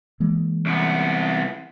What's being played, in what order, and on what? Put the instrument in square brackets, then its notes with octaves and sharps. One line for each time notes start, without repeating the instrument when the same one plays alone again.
[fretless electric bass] E3 G#3 A#3
[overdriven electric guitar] C2 B3